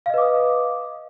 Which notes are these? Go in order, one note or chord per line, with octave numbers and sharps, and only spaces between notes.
B4 D#5 F5 D6 D#6